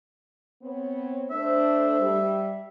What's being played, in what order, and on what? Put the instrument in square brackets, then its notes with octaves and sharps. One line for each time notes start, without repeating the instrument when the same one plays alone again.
[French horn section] B3 C4 C#5
[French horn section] A3 D4 C5 [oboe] E5
[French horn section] G3